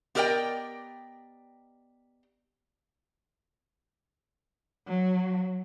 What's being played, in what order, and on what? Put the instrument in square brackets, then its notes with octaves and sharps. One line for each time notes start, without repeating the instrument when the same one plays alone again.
[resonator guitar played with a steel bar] B3 G4 A#4 D5 D#5 G5
[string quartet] F#3